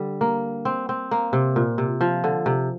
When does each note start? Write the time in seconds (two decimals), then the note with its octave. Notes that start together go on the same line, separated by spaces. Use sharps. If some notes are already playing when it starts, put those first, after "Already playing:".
Already playing: D3 G3
0.21 A#3
0.65 C4
0.89 C4
1.11 A#3
1.33 C3
1.56 A#2
1.78 C3
2.01 F3
2.24 D3
2.46 C3